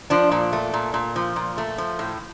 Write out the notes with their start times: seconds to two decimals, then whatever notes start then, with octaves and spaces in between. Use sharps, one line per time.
0.10 F3 D4
0.32 A#2
0.53 A3
0.73 A#2
0.94 A#2
1.16 F3
1.36 A#2
1.58 A3
1.78 F3
1.99 A2